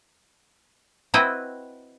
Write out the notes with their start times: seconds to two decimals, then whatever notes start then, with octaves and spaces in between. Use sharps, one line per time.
1.14 C4 E4 F#4 B4 D#5 G5